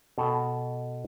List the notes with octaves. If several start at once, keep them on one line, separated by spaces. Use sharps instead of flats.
B2 A4 G5